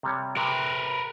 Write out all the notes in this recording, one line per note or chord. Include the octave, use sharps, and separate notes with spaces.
C3 G3 C#5
C3 A#4 B4 G#5